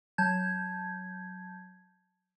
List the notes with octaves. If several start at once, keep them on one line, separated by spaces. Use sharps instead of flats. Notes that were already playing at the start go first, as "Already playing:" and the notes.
F#3 A5 G6 G#6